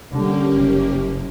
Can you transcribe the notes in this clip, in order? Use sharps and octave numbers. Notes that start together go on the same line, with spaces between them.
D3 G3 A#3 C#4 G4
F#1